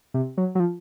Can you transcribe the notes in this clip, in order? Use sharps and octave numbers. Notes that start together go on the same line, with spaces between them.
C3
F#3
F#3
F3